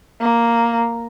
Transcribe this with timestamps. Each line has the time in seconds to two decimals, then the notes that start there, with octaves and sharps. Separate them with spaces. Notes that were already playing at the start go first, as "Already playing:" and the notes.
0.21 A#3